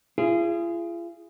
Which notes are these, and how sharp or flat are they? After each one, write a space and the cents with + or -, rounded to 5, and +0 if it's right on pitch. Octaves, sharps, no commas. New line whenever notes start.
F4 -45 G#4 +0